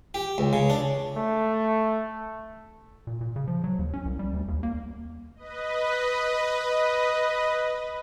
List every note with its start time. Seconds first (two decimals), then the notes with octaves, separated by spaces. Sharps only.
0.14 G4
0.38 C#2
0.53 C#3
0.70 D4
1.16 A3
3.07 A#2
3.21 A#2
3.36 C#3
3.48 F3
3.64 F#3
3.79 D#2
3.94 C#4
4.05 C2
4.19 G3
4.34 D2
4.48 D#2
4.63 A#3
5.35 B4 D#5